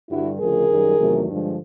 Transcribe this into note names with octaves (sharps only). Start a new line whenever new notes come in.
G2 D3 G3 E4 F#4
D2 C#3 F3 A3 G#4 A#4
F#2 D#3 G3
E2 C3 D#3 F#3 A3
G2 D3 F3 G#3